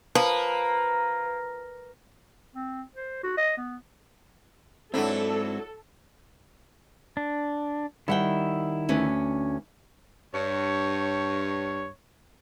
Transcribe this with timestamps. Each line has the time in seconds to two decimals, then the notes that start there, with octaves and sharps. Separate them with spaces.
0.15 F3 A#3 B4
2.55 C4
2.95 C5
3.23 F#4
3.37 D#5
3.57 B3
4.94 G#2 F#3 C4 D4 E4 A4
7.17 D4
8.08 D#3 G3 E4 F#5 G5
8.89 D2 C#4 B4
10.33 G2 C#5